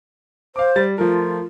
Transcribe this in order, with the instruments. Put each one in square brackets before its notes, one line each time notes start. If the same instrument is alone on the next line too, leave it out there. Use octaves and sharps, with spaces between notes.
[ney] C5 [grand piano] F5 D6
[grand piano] G3 A6
[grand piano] F3 A3 A#4 [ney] F4